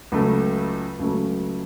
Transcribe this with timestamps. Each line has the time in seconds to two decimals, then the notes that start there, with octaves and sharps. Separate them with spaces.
0.12 C#2 C#3 F#3 A3
0.99 C#2 C#3 F#3 A3